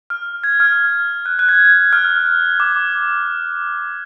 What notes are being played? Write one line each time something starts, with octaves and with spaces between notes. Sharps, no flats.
F6
G#6
F6
F#6
F#6
G#6
F6
D6